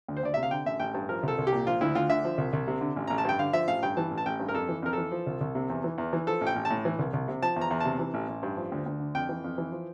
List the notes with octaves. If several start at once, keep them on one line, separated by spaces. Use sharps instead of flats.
D2
C5
D2 D5
C3 E5
F5
D3 G5
A1 E5
A1 G5
G2
F3 A#4
C2 A4
C2
G4
A#2
F3 F4
D2 E4
D2 F4
D3 E5
F3
C2
C2
C3
D3
A1
A1 A#5
A5
G2 G5
D3 F5
F3 E5
A1 F5
G2 G5
E3 A5
A1
A5
A1 G5
G2
A#4
F2 A4
E3
F2 A#4
E3 A4
F3
C2
C2
C3
E2
E3
E2
E3
F3 A4
A1
G5
A1
A5
A2
E3
C2
C2
C3
F3 A5
E2
A#5
E2
C3 A5
E3
A1
A1
G2
F3
D2
D2
D3
F2 G5
E3
F2
E3
F3